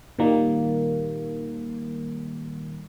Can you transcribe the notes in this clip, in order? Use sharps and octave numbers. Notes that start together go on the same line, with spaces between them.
A#2 D#3 G3 A#3